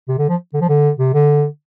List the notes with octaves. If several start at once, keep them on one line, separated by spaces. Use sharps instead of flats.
C3
D3
F3
D3
F3
D3
C3
D3